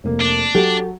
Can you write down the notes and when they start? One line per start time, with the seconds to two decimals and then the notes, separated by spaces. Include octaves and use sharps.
0.04 F1 A#3
0.21 D4
0.55 F#3 G4 A4